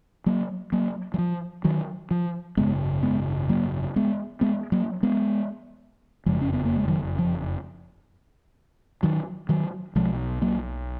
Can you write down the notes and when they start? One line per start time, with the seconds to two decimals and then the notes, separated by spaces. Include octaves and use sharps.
0.26 F#3 A#3
0.72 F#3 A#3
1.14 F#3
1.18 F3
1.64 D#3 F#3
2.11 F3
2.57 G#1 F#2 C#3 G#3 B3
3.03 G#3 B3
3.49 F#3 A#3
3.96 G#3 B3
4.41 G#3 B3
4.72 F#3 A#3
5.03 G#3 B3
6.26 F#1 F2 C#3 F3 G#3
6.41 C#4
6.53 B3
6.65 A#3
6.77 G#3
6.88 D#3 F#3
7.19 F3
9.03 D#3 F#3
9.49 D#3 F#3
9.95 B1 B2 F3 G#3
10.42 F#3 A#3